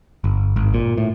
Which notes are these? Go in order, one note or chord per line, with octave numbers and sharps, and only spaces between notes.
G1
G#1
A#2
A2